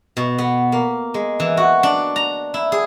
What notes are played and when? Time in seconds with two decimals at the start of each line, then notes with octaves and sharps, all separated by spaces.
0.17 B2
0.38 B3
0.72 A#3
1.14 G#3
1.40 E3
1.57 F#4
1.83 D4
2.16 A#5
2.54 E4
2.72 G#4